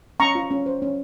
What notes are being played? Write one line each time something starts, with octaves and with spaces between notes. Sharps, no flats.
C#4 A#5 C#6
F4
C#4
C5
C#4